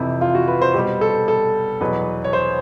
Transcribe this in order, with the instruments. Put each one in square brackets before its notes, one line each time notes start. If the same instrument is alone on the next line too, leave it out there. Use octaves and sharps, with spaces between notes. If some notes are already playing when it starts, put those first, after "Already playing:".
Already playing: [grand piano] F2 C3 E3 E4
F4
F#4
B4
C5
B2 G4
G3
A4
A4
E2 B2 F#3 B4
C#5
C5